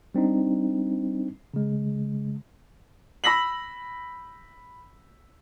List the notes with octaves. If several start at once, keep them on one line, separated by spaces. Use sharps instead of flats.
G3 C4 D4 D#4
C#3 G#3
B5 E6 A#6 B6 F#7